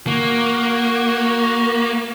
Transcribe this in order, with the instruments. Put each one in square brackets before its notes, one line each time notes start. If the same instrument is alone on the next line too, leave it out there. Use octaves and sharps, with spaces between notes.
[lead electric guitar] A#3 [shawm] F#4